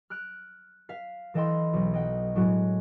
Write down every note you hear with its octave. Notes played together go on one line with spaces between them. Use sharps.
F6 F#6 D7
F5 B6
E3 A4 D#5 G5 B5 C6
B1
D#5 F#5 G5
A2 F#3 G#3 F#4